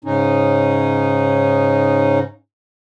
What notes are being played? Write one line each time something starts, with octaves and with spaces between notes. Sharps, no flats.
G#2 C#3 C#4 D#4